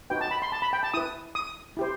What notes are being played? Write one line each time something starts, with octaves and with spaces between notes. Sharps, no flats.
D#4 F#4 B4 G5
A5
B5
C6
A5
B5
G5
A5
E4 B4 D#6
D#6
E4 G4 C5